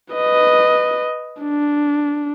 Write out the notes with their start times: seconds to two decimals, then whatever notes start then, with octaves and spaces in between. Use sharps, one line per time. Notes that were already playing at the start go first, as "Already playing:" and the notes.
0.14 B4 D#5
1.43 D4